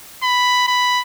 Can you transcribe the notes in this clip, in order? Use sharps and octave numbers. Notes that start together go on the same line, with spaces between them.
B5
B5